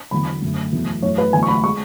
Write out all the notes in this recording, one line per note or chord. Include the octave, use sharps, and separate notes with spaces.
E2 D3 F#3 B5
F#2 D3 A3
E2 B2 F#3 A3
F#2 E3 A3 C#5
B4
E2 D3 F#3 A3 G#5
C#6
B5
G#3 C#6